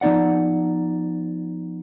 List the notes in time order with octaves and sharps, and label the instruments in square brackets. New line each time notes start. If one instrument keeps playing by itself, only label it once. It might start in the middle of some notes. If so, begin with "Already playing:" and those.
[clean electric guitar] F3 B3 D#4 D5 F#5